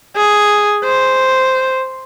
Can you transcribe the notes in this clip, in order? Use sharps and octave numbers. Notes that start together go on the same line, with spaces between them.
G#4
C5